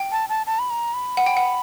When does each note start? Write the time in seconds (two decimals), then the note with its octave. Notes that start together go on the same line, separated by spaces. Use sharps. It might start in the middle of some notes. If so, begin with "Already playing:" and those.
Already playing: G5
0.12 A5
0.29 A5
0.47 A5
0.59 B5
0.70 A#5
0.94 B5
1.17 F#5
1.26 G5
1.37 F#5